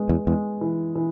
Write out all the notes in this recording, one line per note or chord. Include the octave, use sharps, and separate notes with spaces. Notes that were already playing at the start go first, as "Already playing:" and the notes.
Already playing: G#3 B3
E2
E2 G#3
E3
E3